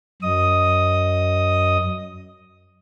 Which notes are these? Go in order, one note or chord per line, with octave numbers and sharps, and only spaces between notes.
F#2 D#5 D#6